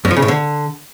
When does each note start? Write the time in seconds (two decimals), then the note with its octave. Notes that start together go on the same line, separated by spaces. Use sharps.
0.05 F#2
0.11 F3
0.16 C#3
0.22 A2
0.28 D3